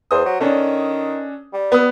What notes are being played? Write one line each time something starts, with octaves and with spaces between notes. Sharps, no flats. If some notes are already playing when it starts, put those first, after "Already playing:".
E2 C5 D#6
F#3
D#3 C#4 D4 A4
G3
B3 D#6